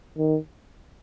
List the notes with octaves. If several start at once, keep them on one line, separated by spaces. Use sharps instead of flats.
D#3